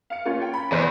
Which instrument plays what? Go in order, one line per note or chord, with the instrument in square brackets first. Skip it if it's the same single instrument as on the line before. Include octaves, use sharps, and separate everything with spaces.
[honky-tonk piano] F5 C#7
A#3 C#4 F4
G5
B5
[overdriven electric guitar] E2 [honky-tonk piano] C5